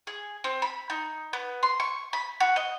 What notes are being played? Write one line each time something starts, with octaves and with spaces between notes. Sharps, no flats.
G#4
C4
B5
D#4
B3
C6
C#6
B5
F#4
D#5